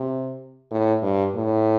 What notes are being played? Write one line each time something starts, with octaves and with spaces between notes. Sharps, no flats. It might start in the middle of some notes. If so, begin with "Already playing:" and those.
Already playing: C3
A2
G2
A2